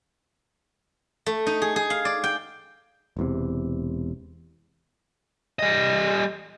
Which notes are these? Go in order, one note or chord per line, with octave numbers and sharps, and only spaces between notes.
A3
D#4
G#4
G#4
F5
D5
G5
E1 E2 C3
G3 D#5